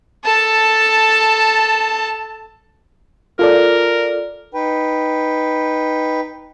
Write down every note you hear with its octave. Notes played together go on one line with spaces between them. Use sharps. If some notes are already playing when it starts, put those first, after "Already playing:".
A4 A5
F4 A4 A#4 D5
D#4 B4 G5